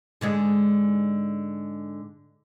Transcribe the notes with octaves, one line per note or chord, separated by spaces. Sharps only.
G#2 D3 G#3